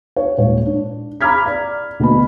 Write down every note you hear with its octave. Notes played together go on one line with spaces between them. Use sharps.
C#5
D#1 G#2 C#5
D4
A#5 B5 D6 F6 G#6 B6
D5
D2 B2 B5